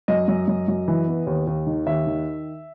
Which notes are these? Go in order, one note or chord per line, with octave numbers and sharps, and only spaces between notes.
F#2 D#5
F#2
F#2
F#2
E3
B3
D#2
D#2
D#3
D#2 E5
D#3